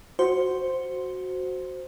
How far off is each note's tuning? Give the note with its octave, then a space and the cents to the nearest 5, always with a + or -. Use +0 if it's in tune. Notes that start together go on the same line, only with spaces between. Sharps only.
F#4 +0 C5 +0